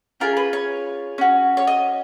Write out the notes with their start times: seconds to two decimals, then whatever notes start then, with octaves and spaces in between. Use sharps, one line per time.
0.20 C#4 F4 G#4 A#4
0.37 B4
0.53 C#5
1.18 C#4 F#4
1.57 C#5
1.67 D#5